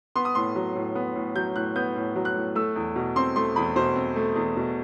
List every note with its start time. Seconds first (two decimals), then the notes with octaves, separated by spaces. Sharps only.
0.16 B3 C6
0.25 D#6
0.35 A2 C6
0.56 F#3
0.76 A2
0.95 B3
1.15 A2
1.35 F#3 G6
1.56 A2 F#6
1.76 B3 G6
1.96 A2
2.16 F#3
2.25 F#6
2.35 A2
2.55 A3 E6
2.76 E2
2.96 B2
3.16 C4 C6
3.36 A3 C6
3.56 E2 B5
3.76 B2 C5
3.96 C4
4.16 A3
4.36 E2
4.56 B2